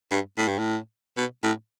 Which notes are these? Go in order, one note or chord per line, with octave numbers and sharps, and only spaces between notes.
G2
A2
G2
A2
B2
A2